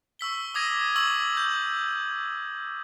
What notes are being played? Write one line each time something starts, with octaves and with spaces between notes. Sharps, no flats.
C#6 E6 B6 G7
D6 D#6 G#6 A#6 D#7
C#6 E6 F#7
G6